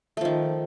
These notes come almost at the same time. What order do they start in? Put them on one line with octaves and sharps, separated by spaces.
A3 F3 D#3